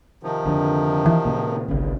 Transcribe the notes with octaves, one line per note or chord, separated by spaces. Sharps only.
C3 D#3 F3
F2 D3
E3
A#2 C#3
G1 C2 C#3